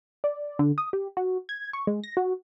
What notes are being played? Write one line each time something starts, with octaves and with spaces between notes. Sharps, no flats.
D5
D3
D#6
G4
F#4
G#6
C#6
G#3
A#6
F#4